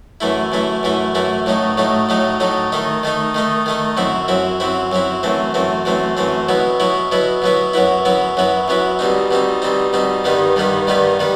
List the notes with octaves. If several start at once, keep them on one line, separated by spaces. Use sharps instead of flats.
F#2 E3 A3 E4
F#2 E3 A3 E4
F#2 E3 A3 E4
F#2 E3 A3 E4
A2 F#3 A3 D#4
A2 F#3 A3 D#4
A2 F#3 A3 D#4
A2 F#3 A3 D#4
D#3 A3 D#4
D#3 A3 D#4
D#3 A3 D#4
D#3 A3 D#4
F#2 F#3 C4 E4
F#2 F#3 C4 E4
F#2 F#3 C4 E4
F#2 F#3 C4 E4
F#2 E3 A3 C4
F#2 E3 A3 C4
F#2 E3 A3 C4
F#2 E3 A3 C4
B2 F#3 B3 E4
B2 F#3 B3 E4
B2 F#3 B3 E4
B2 F#3 B3 E4
F#2 F#3 B3 E4
F#2 F#3 B3 E4
F#2 F#3 B3 E4
F#2 F#3 B3 E4
B2 G3 C4 D#4
B2 G3 C4 D#4
B2 G3 C4 D#4
B2 G3 C4 D#4
G2 D#3 G3 B3 D#4
G2 D#3 G3 B3 D#4
G2 D#3 G3 B3 D#4
D#3 G3 B3